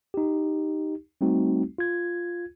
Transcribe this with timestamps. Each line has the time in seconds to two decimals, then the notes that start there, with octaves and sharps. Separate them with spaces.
0.14 D#4 G4
1.21 G3 A3 C4 D#4 F#4
1.78 F4 G#6